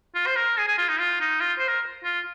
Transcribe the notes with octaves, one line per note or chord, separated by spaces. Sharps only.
F4
C5
A#4
G#4
G#4
F4
D#4
F4
D#4
F4
C5
A#4
F4